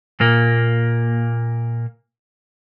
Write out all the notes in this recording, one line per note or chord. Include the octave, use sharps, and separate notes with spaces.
A#2 A#3